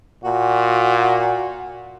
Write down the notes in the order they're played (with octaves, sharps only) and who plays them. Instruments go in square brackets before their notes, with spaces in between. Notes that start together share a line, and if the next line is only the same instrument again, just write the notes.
[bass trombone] A#2 [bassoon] F#4